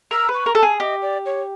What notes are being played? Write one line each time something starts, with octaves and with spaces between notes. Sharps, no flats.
A#4 E6
B4
C#6
A#4
A4 A5
G#4
G4 D#5
D5
C#5